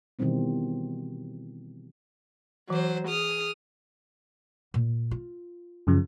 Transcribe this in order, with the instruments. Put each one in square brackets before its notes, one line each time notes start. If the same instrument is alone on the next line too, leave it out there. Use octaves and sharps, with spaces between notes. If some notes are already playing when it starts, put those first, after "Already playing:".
[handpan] B2 D#3 E3 G3 C4 D#4
[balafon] E3 [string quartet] F#3 C5
[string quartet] G#4 D#6 F6
[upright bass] A#2
F4
[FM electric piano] F#2 C#3 F3